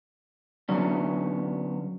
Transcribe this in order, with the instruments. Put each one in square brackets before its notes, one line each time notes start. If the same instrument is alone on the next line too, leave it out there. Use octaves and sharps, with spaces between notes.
[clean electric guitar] D3 F#3 B3 C#4 D4